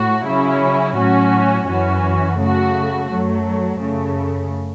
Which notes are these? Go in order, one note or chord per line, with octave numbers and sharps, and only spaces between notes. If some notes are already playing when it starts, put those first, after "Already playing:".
Already playing: A2 A3 F#4
C#3 F#3 C#4 E4
A2 F#3 C#4 F#4
F#2 E3 C#4 F#4
C#3 A3 F#4
F#2 F#3 A3
F#2 C#3 A3